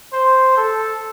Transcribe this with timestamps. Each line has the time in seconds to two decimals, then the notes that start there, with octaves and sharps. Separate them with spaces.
0.13 C5
0.57 A4